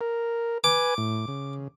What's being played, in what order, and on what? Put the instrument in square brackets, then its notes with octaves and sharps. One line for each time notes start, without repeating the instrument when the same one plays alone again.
[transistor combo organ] A#4
[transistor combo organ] B4 G#5 [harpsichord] D6
[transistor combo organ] A2
C#3